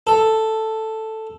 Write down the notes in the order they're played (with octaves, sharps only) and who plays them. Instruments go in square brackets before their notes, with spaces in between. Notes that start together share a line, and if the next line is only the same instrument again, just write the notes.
[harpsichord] A4